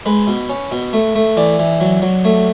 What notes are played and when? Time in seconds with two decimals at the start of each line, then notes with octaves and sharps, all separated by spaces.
0.06 G#3 B4
0.27 B2
0.49 C#4
0.72 B2
0.93 A3
1.15 A3
1.37 E3 D5
1.59 E3
1.81 F#3
2.02 F#3
2.25 A3